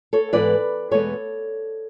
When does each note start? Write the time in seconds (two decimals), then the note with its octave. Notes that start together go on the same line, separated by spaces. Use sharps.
0.13 A4 C#5
0.33 G#2 E3 B3 B4 D5
0.91 E2 B2 G#3 B3 A4 C#5